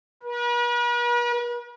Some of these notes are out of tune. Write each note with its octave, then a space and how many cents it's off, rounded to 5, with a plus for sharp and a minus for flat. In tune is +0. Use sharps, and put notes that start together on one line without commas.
B4 -45